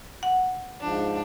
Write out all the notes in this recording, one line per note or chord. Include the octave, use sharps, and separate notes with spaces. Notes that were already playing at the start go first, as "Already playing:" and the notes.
F#5
G#2 F3 D4